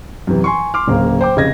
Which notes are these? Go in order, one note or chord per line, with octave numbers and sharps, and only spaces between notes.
F#2 C3 E3
G#5 C6 C#6
C6 D6 F6
D1 C#3 A#3 C5
C5 G5 D6
F1 C#3 D#5 G#6 A#6